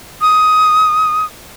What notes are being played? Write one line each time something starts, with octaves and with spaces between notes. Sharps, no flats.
D#6